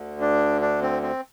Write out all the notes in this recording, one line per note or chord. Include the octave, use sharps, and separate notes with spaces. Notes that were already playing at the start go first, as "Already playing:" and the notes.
Already playing: D2 D3
D4
D4
C4
C4